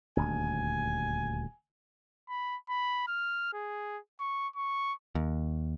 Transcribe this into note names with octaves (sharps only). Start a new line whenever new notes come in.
D#1 D2 G#5
B5
B5
F6
G#4
C#6
C#6
D#2